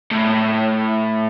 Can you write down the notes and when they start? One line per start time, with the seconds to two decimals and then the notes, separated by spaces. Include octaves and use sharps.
0.12 A2